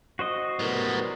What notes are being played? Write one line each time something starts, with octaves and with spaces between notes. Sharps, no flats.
F#4 C5 D#5
A2 G3 B3 A#4